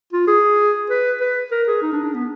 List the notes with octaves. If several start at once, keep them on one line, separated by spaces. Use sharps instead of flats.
F4
G#4
B4
B4
A#4
G#4
D#4
D4
D4
B3